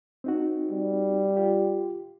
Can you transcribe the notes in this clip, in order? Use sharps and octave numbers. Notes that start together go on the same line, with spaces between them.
C4 D#4 F#4
G3
F4 G4